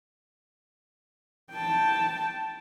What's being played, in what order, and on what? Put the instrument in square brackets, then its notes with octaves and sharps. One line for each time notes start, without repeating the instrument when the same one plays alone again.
[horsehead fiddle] G5 A5